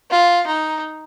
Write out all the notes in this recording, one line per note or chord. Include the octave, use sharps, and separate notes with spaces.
F4
D#4